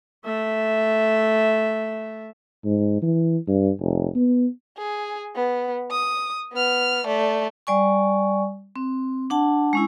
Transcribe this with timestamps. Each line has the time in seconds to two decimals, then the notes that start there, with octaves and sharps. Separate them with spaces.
0.25 A3 E5
2.65 G#2
3.02 E3
3.48 G2
3.79 F1
4.15 B3
4.78 G#4
5.35 B3
5.91 D#6
6.53 B3 F6
7.06 A3 D5
7.67 G3 D5 G#5 C#6
8.76 C4
9.30 D4 F#5 A5
9.73 G#3 C#4 E4